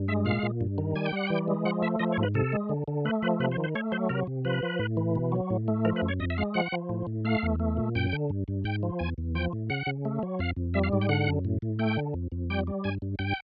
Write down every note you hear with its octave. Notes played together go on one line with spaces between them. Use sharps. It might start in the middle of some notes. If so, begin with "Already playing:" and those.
Already playing: G2
G#3 E5
A#2 F5
A#2
G2
D#3
G3 G#5
G5
G3 F#5
E3 G5
G#3
F3 F#5
A3 E5
F3 D#5
C#5
G#2
B4
C3 A4
G#3
D3
D3
A3 B4
F3 B4
C3 B4
C5
D#3
C5
A3 C#5
F#3 C5
C3 A#4
C3
F3 B4
F3
A2
E3
B2
F#3
A2
A3
F3 A#4
B4
F#2
C#5
F2 D#5
E5
G#3 F5
F3 F#5
F3
A2
A2
A3 F5
E2
A3
A#2
F#2 G5
D3
G2
G2
G#2 G5
F3
E2 G#5
E2
F3 G5
A2
C#3 F#5
C#3
A3
F#3
F2 F5
F2
G3 E5
F5
G#2
G5
D3 F#5
F#2
A2
A2
A3 G5
D3
F2
F2
G3 G5
G3
G2 G#5
G2
G2 G5